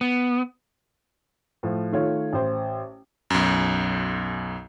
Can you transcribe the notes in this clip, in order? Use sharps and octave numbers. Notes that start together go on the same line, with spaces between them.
B3
A2 F3
D#3 A3 F4 C#5
A1 C5
B1 F#2